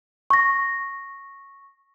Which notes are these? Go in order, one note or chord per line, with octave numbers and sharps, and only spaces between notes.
C#6 A#6